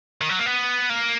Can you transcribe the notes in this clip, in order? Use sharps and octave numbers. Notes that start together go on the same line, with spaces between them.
D#3
F#3
A#3
B3
A#3